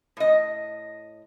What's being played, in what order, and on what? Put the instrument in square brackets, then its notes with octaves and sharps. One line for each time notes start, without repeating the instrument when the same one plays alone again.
[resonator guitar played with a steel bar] A2 D#5